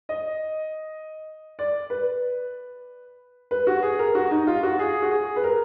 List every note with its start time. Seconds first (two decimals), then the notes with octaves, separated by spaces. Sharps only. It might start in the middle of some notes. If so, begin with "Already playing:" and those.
0.09 D#5
1.59 D5
1.90 B4
3.51 B4
3.67 F#4
3.82 G#4
3.99 A#4
4.15 F#4
4.31 D#4
4.47 F4
4.63 F#4
4.79 G#4
5.02 F#4
5.11 G#4
5.36 B4
5.44 A#4